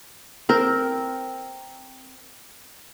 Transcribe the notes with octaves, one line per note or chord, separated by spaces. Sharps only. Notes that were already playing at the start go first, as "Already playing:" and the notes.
C4 A#4